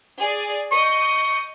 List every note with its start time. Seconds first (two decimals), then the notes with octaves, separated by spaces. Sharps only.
0.19 G#4 D5
0.72 D#5 C#6 G6